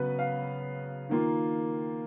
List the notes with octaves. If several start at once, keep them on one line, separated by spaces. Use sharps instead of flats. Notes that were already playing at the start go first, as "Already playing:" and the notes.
Already playing: C#3 F#3 B3 B4
F5
D#3 A#3 F4